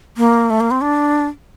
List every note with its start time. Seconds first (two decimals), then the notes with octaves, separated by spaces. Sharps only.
0.17 A#3
0.50 A3
0.60 A#3
0.71 C4
0.81 D4